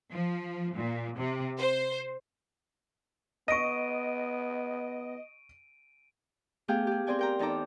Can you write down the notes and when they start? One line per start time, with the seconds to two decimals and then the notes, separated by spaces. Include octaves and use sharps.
0.12 F3
0.75 A#2
1.18 C3
1.59 C5
3.48 B3 D#5 C#6 A#6 D7 D#7
6.68 A3 B3 G4 G#4 F5 G5
6.87 G4 G#4
7.07 C4 G#4 C5 D5 G5 G#5
7.19 A#4 G5 A#5
7.39 E2 D#4 A4 A#5 D6